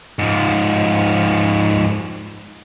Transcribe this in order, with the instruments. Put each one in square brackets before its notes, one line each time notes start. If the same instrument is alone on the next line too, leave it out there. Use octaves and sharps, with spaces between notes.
[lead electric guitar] G#2 F3